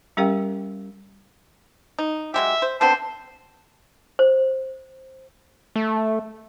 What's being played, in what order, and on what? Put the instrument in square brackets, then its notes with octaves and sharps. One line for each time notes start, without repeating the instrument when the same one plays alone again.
[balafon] G3 C#4 G4 A#4 F5 G5
[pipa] D#4
[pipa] F#3 G#3 G4 [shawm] E5
[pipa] C5
[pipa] D3 B3 C4 [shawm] C5 [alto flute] A5
[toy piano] C5
[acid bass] A3